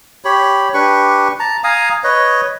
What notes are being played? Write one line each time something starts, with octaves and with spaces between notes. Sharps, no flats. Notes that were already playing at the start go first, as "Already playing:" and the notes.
G4 C#5 B5
D4 G4 B4 C#6
A5 A#5
F5 G#5 A#5 D#6
B4 C#5 D#5